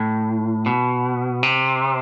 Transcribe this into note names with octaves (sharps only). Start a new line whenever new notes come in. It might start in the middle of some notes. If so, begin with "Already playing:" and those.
Already playing: A2
B2
C3